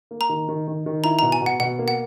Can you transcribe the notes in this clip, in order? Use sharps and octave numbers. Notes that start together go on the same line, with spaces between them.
A#3
A#5
D#3
D#3
D#3
D#3
E4 A#5
A#5
B2
G#5
B2
F#5
B2 F#5
A#3
F#5